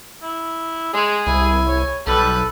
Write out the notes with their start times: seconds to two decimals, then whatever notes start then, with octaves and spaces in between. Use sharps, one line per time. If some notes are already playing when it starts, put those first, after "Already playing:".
0.23 E4
0.94 G#3 G#4
1.27 C2 E4 G#5
1.68 C#5
2.07 B1 G3 A4 B4